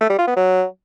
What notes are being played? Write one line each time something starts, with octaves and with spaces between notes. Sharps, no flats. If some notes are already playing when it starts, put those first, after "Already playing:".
A3
G3
F4
B3
F#3